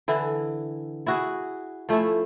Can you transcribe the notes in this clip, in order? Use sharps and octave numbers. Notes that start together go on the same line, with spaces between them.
D3 E3 E4
E4 F#4 G#4
F3 A3 C#4 E4